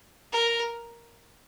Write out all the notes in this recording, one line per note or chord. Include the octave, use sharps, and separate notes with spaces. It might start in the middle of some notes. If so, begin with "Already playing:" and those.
A#4